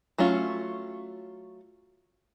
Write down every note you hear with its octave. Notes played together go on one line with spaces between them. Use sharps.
F#3 A3 C#4 F4